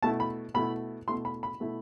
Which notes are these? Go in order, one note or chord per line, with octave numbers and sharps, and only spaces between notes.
B2 A3 E4 A5
B5
B2 A3 E4 B5
B2 A3 E4 C6
B5
B5
B2 A3 E4